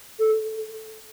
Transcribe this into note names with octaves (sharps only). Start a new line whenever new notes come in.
A4